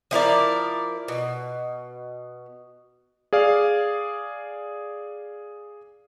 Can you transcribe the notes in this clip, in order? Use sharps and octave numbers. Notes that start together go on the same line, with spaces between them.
F3 E4 A#4 D5
B2
G#4 D5 F5